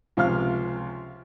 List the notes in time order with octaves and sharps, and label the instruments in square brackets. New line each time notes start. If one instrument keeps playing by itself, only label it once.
[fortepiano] C#2 C3 F3 F5 F6